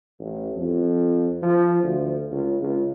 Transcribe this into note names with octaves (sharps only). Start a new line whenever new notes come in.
A1
F2
F3
D2
C#2
C#2